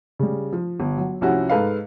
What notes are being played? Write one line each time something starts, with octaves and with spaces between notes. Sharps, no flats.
C#3 G3
F3
G1
F#3
C2 F3 C#4 E4 F#4
G#2 A4 B4 F5